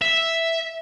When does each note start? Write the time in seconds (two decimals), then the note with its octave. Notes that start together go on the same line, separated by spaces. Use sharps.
0.01 E5